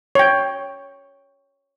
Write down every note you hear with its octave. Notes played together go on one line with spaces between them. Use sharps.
C#5 G5